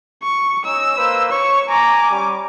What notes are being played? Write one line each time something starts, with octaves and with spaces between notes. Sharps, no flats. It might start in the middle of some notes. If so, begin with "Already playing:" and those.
C#6
C#4 D#4 E6
A#3 B4 C5
C#5 C#6
G#5 A#5 D6
G3 C#4